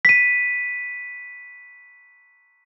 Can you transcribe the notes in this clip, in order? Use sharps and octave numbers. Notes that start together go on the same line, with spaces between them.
B6 D#7